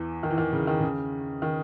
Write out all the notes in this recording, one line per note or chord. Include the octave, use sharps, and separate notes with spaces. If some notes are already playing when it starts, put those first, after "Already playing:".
Already playing: E2 E3
D#3
E3
D#3
C#3
D#3
C#3
D#3